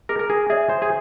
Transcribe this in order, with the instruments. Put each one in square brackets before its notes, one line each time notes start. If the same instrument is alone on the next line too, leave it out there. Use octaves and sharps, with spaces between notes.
[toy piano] G#4 [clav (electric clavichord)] A#4
[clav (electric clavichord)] A#4
G#4
[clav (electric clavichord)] G#4 [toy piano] C#5 E5
[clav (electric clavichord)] C5
G#4